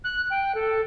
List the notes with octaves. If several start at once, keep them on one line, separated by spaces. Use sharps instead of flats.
F#6
G5
A4